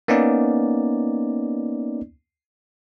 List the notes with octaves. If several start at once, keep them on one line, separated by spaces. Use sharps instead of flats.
A#3 B3 C#4 D#4 D5